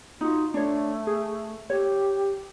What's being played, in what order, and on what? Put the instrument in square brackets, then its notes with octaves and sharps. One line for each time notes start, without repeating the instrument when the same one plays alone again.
[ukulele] D#4 F#4 [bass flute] F4
[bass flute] A3 [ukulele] D4 C#5
[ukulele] G#4
[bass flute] G4 [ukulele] C#5